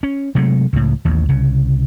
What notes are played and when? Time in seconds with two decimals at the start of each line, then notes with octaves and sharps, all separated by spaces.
0.03 C#4
0.35 C3 F#3 G#3 A3
0.73 C#2 A2
1.05 A1 D#2
1.29 C2 C#3